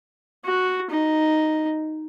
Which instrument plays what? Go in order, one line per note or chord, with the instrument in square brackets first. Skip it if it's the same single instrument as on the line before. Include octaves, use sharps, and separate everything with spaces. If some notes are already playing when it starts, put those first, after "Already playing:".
[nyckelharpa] F#4
D#4